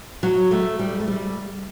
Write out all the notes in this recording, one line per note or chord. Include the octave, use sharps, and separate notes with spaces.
F#3
A3
G3
A3
G3